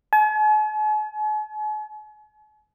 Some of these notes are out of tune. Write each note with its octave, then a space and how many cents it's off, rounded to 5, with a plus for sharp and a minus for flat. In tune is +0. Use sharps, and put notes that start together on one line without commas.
G#5 +45